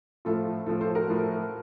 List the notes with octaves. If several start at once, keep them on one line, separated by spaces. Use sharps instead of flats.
A2 F3 A3 F4 A4
A2 F3 A3 F4 A4
A4 C5
F#4 A#4
A2 F3 A3